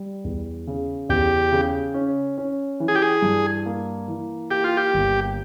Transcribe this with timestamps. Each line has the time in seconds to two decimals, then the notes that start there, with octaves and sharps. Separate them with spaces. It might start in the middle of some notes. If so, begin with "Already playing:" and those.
Already playing: G3
0.24 E2
0.67 C#3
1.09 E2 G4
1.52 C#3
1.94 C#4
2.38 C#4
2.80 E3
2.88 G#4
2.95 G4
3.02 G#4
3.22 G2
3.66 A#3
4.08 E3
4.51 A#3 G4
4.64 F4
4.77 G4
4.94 G1